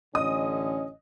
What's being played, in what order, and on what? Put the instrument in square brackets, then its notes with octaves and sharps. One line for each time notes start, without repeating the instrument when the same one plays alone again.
[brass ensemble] A1 D3 C#4 [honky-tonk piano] D#5 D#6